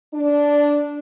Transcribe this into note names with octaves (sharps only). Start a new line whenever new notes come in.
D4